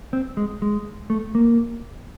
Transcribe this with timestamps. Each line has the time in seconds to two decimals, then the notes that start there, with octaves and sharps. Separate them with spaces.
0.13 C4
0.37 G#3
0.62 G#3
1.10 A3
1.35 A#3